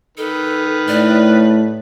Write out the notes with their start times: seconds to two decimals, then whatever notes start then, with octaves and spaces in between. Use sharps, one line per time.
0.17 D#3 A4 B4
0.88 A2 D5